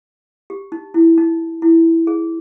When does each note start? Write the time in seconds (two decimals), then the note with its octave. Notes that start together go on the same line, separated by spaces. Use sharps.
0.50 G4
0.72 D#4
0.94 E4
1.18 D#4
1.62 E4
2.07 G#4